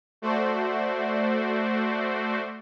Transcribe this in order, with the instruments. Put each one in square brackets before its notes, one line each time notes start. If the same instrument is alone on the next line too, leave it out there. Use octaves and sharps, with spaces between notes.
[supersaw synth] A3 F#4 C5 D5